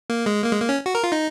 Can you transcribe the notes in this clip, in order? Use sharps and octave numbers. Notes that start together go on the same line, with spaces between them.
A#3
G#3
A#3
G#3
A#3
C#4
F#4
A#4
F4
D#4